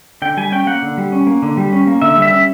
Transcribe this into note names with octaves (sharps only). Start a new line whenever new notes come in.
D3 G5
G3 G#5
C#4 G5
A#3 F#5
D3
G3
C#4
A#3
D3
G3
C#4
A#3
D3 E5
G3
E5
C#4